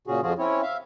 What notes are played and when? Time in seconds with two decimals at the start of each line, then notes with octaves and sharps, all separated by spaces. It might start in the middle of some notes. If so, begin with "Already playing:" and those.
0.07 A#2 C#3 C#4 F#4 G#4
0.23 F2 F3 F4 F#4 G#4
0.38 C4 C#4 E4 C#5
0.63 E5 F5